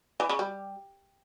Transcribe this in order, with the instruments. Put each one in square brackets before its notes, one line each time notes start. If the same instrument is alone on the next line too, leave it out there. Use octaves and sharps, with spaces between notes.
[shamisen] E3
C#3
G3